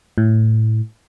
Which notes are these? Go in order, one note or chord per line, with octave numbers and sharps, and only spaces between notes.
A2